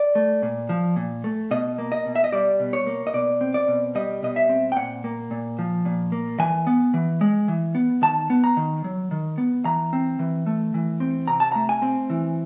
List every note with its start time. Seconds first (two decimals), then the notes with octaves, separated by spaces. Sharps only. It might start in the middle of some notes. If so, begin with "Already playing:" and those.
Already playing: D5
0.15 A3
0.43 A#2
0.69 F3
0.96 A#2
1.24 A3
1.51 B2 D#5
1.78 A#3
1.92 D#5
2.06 B2
2.15 E5
2.24 D#5
2.32 G3 D5
2.60 B2
2.73 C#5
2.87 A#3
3.07 D#5
3.14 B2 D5
3.41 C4
3.54 D5
3.68 B2
3.95 G3 D#5
4.23 B2 D#5
4.36 E5
4.49 C4
4.72 G5
4.76 A#2 F#5
5.04 A#3
5.31 A#2
5.59 F3
5.85 A#2
6.12 A#3
6.39 E3 G#5
6.67 B3
6.94 E3
7.21 G#3
7.48 E3
7.75 B3
8.02 D#3 A5
8.30 B3
8.44 A#5
8.57 D#3
8.84 F#3
9.11 D#3
9.38 B3
9.65 E3 A#5
9.93 C4
10.19 E3
10.46 A3
10.74 E3
11.00 C4
11.28 C3 A#5
11.40 A5
11.52 A3 A#5
11.69 G#5
11.82 C4
12.10 E3